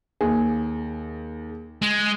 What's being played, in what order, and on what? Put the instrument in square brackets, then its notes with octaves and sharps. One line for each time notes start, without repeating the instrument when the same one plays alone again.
[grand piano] D#2 [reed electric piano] G#4
[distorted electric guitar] G#3